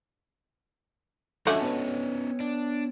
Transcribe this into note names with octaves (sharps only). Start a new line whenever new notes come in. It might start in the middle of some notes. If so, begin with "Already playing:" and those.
F2 D3 A3 C#4 D#4 F#4 E5 G#5
B3 B4 C#5
D4